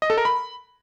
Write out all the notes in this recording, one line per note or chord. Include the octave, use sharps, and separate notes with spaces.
D#5
A4
A#4
B5